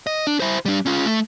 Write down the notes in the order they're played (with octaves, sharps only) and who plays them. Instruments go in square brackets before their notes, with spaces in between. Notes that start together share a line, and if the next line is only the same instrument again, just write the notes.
[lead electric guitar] D#5
D4
E4 C5
G3 D4
C#4 F4
A3